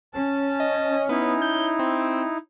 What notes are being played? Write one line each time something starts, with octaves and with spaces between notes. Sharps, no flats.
C#4 A5
D#5
B3 D#4 E4
G6
C4